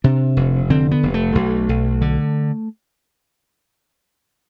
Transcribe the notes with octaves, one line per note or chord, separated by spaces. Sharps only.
C3 D4
F1
D3 C4
B3
F1
A3
B1
B1
D3